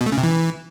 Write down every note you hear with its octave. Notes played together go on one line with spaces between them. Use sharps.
B2
A3
C#3
C3
E3